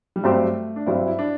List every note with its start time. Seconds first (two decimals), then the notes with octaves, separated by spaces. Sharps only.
0.16 G3
0.23 G2 F#3 A3 C4 G4 C5
0.76 D4
0.86 G2 F#3 C4 E4 G4 C5
1.07 E4
1.19 D4